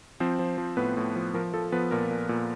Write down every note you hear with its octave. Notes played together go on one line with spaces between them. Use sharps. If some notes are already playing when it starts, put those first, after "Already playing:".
F3 C4 C5
F3
F3
A2 B3 B4
A2
F3
F3 A#4
F3 A4
F3 B3 B4
A#2 A#4
A#2
A#2